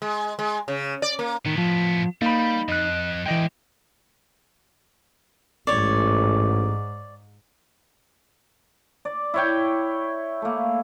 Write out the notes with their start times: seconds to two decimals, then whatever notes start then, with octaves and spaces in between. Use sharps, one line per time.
0.02 G#3
0.39 G#3
0.68 C#3
1.02 D5
1.19 A#3
1.46 A2 D#3 B3
1.58 F3
2.22 G3 A#3 D#4 B5
2.69 F2 D#5 F#6
3.26 E3 G#3 D5 D#5 G5
5.67 A1 G#2 C#5 D5
9.05 D5
9.34 E4 C#5 G5
10.42 A3 A#3